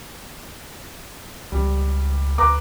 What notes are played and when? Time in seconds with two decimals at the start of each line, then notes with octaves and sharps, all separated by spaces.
1.52 C#2 G3
2.38 D2 B4 A#5 D6